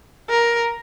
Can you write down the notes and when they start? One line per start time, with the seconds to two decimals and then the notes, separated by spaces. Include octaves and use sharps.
0.30 A#4